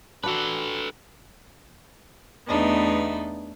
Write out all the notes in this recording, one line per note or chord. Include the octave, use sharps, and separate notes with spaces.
D4 F#4 A4 B4
E2 A3 B3 D4 D#4